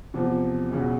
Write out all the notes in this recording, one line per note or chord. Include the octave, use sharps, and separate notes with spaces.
E2 C3 F3
E1 E2 C#3 F#3